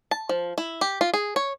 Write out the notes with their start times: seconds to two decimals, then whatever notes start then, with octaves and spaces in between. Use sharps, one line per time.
0.11 A5
0.29 F3
0.58 E4
0.81 G4
1.01 F4
1.14 G#4
1.36 C#5